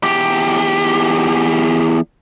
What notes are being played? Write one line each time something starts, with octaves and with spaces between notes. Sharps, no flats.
E2 G4